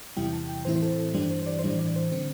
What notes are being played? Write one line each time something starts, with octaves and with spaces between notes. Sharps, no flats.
E2 C3 G3 E4 G5
A5
G5
A2 E3 C4 E4 C5
C5
A4
G2 E3 G3 D4 C5
C5
C5
D5
C5
A2 E3 G3 D4 D5
D5
C5
D3 C4